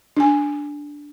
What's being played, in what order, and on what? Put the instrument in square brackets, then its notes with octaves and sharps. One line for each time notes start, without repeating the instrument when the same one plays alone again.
[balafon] D4 G#5